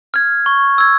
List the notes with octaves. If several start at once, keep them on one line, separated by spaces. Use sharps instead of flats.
F6 G#6
C#6
E6 G#6